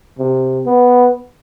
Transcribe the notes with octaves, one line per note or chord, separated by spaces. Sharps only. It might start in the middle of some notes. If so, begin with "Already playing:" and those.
C3
B3